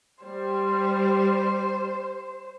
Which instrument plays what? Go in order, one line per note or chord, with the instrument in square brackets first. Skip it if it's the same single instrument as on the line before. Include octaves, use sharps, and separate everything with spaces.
[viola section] G3 [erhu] C5